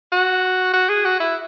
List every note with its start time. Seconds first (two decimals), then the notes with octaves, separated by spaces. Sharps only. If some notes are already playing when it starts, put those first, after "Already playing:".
0.12 F#4
0.74 F#4
0.89 G#4
1.05 F#4
1.20 E4